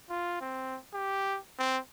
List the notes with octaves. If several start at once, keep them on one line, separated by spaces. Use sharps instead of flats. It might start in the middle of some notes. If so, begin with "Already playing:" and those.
F4
C4
G4
C4